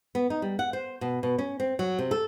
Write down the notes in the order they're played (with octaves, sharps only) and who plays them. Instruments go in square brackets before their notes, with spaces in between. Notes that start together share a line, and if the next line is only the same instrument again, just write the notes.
[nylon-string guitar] B3
D#4
G3
F#5
C5
B2
B2
C#4
C4
F#3
C3
A4